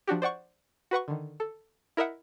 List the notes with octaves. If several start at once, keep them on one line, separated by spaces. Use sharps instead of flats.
F3 D4 F#4 G4
C5 D5 F#5 C#6
F#4 B4 F#5 C#6
D3 D#3
A4
E4 A#4 D#5 E5 F#5